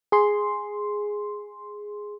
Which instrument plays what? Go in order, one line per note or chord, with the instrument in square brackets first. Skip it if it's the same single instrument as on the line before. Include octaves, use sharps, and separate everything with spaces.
[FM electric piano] G#4 C6